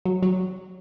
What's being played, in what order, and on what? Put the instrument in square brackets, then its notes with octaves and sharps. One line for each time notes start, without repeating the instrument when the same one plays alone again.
[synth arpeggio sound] F#3
F#3